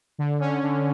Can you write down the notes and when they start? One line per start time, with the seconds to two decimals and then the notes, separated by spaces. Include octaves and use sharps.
0.19 D3
0.40 C#4
0.63 D3